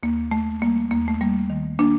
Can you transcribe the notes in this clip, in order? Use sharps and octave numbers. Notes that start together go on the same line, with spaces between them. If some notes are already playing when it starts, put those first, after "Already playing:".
D#2 A#3
D#2 A3
G3 A#3
D#2 A#3
A3
G3 A#3
D#3
A#3 D4